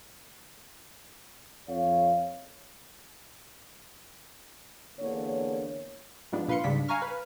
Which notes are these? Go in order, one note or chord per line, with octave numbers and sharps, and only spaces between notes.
F2 C#5 F5
E2 D3 A#3 C#5
G#2 F3 G3 B3 D4
A#2 B4 F5 C6 C#7
G#2 C#3 G3 D4 B6
F5 G#5 A#5 C#6 F6
B4